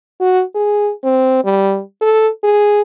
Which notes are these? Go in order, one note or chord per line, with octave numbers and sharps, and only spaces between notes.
F#4
G#4
C4
G3
A4
G#4